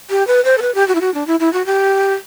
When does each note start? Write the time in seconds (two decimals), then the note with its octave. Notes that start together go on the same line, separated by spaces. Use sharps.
0.10 G4
0.27 B4
0.45 C5
0.58 A4
0.62 B4
0.75 G4
0.88 F#4
0.95 E4
1.01 F#4
1.14 D4
1.27 E4
1.40 E4
1.53 F#4
1.66 G4